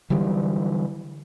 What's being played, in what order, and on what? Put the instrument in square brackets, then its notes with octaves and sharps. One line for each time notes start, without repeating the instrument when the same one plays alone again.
[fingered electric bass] D3 E3 F#3 G3